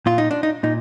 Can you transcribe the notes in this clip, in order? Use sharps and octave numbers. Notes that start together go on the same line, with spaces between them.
A#2 F4
D#4
D4
D#4
A#2 D#4